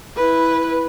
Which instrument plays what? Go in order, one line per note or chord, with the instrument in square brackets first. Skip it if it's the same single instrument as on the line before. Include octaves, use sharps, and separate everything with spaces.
[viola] E4 B4